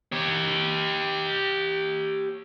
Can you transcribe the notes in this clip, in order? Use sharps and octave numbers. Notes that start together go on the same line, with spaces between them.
G4 C#5